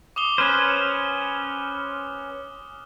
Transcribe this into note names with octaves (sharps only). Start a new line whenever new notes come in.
D6 D#6 G7
C#4 B4 C5 F6 F#6